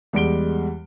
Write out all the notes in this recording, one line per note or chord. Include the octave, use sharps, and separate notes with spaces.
E2 G3 G#3 D7 G7